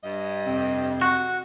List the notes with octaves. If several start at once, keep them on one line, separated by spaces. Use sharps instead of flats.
G2 D#5
F2 C3 C4
F#4